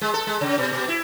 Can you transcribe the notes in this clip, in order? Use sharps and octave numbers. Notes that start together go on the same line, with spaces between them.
G#3
A4
G#3
C#3
B2
B2
E4